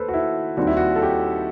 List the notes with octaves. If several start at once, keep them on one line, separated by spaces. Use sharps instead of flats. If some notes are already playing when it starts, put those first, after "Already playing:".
Already playing: D#2 A3 A4 B4 C5
F#4
E4
D#2 D#3 G3 C4 F#4
E4
F#4
A4
G4